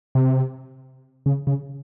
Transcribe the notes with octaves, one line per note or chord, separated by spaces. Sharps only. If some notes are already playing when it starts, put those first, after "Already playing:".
C3
C#3
C#3